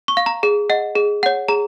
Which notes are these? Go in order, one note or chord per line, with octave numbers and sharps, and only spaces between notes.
C#6
F5
A#5
G#4
D#5 F#5
G#4
C#5 F#5
G#4 A#5